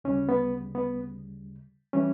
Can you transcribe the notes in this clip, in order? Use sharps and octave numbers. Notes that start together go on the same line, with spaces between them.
D2 C#3 G3 C#4
B3
B3
E3 G3 C#4